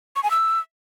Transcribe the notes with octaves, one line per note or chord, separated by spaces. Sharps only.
C#6
G#5
E6